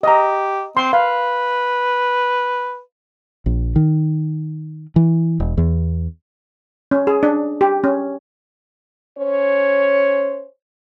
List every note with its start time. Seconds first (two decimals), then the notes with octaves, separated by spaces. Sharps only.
0.03 G4 D#5 A#5
0.77 C4 C6
0.93 B4 F5
3.46 A#1
3.76 D#3
4.96 E3
5.40 E1
5.58 E2
6.91 C#4
7.07 G#4
7.23 D4
7.61 G4
7.84 C#4
9.18 C#4 C5 C#5